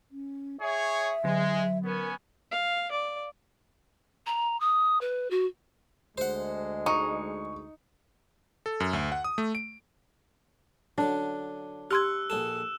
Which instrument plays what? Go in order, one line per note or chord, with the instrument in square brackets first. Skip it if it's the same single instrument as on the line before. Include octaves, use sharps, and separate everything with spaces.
[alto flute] C#4
[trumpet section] G#4 C#5 [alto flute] E5
[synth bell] D3 F#3 [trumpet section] G#3
[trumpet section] B3 C#4 G#5 [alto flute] A#4
[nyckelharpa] F5
D5
[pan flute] A#5
D#6
B4
F#4
[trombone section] D2 G#3 [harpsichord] C5 F#5
[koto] D#4 [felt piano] C#6
[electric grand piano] A4
F#2
D2
F#5
D#6
A3
D7
[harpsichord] D3 F#3 [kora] D4
[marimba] G4 C6 G#6 [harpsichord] F#5 [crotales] E6 F#6
[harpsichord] A#1 G#4 A4 [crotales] E7